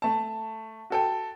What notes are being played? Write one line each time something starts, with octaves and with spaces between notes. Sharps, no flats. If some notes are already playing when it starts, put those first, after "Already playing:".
A3 A5
F#4 A4 G5